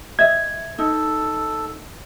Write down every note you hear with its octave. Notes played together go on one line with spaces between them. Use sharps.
D#5 E5 G#6
D#4 A4